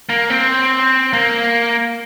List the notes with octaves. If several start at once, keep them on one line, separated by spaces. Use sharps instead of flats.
A#3
C4
A#3